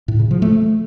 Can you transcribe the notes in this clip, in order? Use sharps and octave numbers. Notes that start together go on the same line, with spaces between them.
A2
C#3
F3
A3